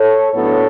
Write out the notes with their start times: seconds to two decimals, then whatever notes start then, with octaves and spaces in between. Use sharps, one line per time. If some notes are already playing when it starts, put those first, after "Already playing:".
Already playing: A4 C#5
0.33 A2 F#3 B3 D4 A4 C#5